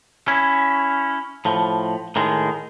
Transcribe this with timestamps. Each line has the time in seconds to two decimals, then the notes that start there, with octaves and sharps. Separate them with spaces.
0.28 C#4 E4
1.45 A2 F3
2.16 A2 D#3 G#3